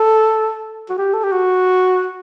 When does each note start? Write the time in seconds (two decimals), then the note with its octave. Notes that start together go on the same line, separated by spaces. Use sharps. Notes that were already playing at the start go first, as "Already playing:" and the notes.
Already playing: A4
0.89 F#4
0.98 G4
1.13 A4
1.23 G4
1.32 F#4